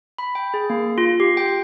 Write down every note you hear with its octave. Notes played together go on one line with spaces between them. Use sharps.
B5
G5
G#4
A#3
F4
G4
G5